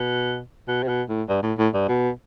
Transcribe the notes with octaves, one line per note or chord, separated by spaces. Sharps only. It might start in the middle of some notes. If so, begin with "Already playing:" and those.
Already playing: B2
B2
C3
B2
A2
G2
A2
A2
G2
B2